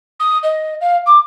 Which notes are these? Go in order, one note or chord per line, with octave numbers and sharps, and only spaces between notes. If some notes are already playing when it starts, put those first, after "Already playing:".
D#6
D#5
F5
D6